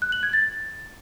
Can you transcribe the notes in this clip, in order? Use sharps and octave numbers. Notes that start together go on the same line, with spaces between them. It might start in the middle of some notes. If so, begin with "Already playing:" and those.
F#6
F#7
G#6
A6